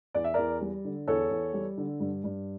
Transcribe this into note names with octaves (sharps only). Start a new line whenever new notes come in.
E2 D5
E5
E2 A#4 D5
G3
D3
E2 A4 C#5
E2
G3
D3
G2
G2